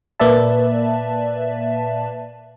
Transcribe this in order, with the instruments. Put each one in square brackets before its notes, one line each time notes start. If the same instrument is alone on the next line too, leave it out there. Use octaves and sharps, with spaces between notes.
[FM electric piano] A#2 A#3 B4 D5 E5 A5